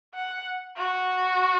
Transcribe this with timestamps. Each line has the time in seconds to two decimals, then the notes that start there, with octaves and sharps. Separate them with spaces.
0.14 F#5
0.78 F#4